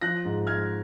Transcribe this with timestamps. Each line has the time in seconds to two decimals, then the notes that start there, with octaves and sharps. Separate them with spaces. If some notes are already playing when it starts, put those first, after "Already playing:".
0.01 F3 F#6 A#6
0.25 G#2
0.47 G#3 F6 G#6